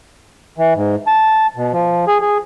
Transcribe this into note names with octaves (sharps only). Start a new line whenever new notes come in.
E3
G#2
A5
B2
F3
G#4
G#4